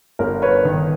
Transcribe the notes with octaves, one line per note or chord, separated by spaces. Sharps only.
G1 A#4
B4 C#5
D#3